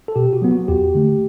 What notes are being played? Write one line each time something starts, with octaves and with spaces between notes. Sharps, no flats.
A4
B2 G4
F#4
F#3 B3
F#4
E2 G4
D3 A3